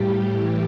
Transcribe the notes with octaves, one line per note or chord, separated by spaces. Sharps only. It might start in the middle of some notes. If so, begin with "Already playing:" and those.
Already playing: A2 G3 G4
A2 E3 G3